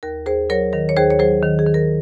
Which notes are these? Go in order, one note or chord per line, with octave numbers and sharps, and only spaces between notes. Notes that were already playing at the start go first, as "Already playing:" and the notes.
D#2 A#4
D#2 G#4 C5
F#3 A#4 C#5
D#3 A#4
C#5
D#2 G#4 C5
C#5
F#3 G#4 C5
D#3
G#4
D#3
A#4